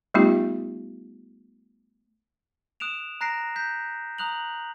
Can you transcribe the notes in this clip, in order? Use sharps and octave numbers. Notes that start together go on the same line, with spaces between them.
G3 A3 B3 D#4 F4 G4
D#6 F#6 D7 E7 F7
A#5 F#6 A#6 C7 D7
G6 B6
A#5 D#6 F#6 F7 F#7